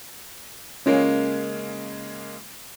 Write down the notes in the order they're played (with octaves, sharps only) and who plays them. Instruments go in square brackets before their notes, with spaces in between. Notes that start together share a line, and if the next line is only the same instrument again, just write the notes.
[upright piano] C#3 G#3 A#3 [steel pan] C#4 F4